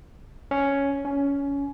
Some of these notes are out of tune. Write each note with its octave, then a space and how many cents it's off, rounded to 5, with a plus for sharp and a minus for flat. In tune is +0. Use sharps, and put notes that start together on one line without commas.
C#4 +5
C#4 +20